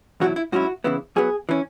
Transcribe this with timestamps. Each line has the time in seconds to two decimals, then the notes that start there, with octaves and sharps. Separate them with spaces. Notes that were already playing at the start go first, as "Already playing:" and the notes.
0.20 E2 B2 F#3 E4 F#4
0.36 E4
0.52 G#2 F#3 C#4 E4 F#4
0.84 C#3 E3 B3 E4
1.16 F#2 F#3 B3 G#4
1.49 E3 C#4